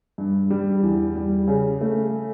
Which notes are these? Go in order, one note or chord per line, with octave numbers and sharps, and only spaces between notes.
G2
G3
E2
G3
C#3
A3